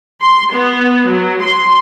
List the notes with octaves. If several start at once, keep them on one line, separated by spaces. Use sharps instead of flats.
C6
B3
F#3
C6